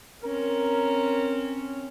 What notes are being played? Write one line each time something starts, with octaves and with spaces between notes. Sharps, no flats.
C4 C#4 A#4